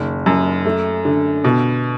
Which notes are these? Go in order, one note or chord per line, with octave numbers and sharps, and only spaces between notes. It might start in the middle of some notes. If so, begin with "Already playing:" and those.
Already playing: F#1 D#3
F#2
A3
D3
B2